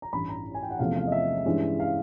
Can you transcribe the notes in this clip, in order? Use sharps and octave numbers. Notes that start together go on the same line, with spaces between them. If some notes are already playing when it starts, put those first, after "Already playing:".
A#5
A1 G2 E3 B5
A#5
G#5
G5
F#5
E2 C3 F3 A3 C#4 F5
F5
D#5
E5
G2 E3 G#3 C#4
F5